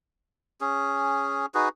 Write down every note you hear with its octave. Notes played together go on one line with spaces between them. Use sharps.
C#4 G#4
D#4 F#4 G#4 B4